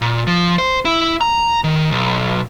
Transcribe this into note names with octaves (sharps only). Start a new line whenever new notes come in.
A#2
F3
C5
E4
A#5
D#3
B1